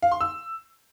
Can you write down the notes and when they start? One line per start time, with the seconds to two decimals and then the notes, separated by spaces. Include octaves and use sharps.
0.02 F5
0.12 C6
0.21 E6